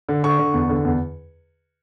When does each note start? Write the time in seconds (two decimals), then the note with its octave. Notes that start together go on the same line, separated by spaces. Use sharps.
0.09 D3
0.24 D3 C#6
0.39 D3
0.54 E2
0.69 D3
0.84 E2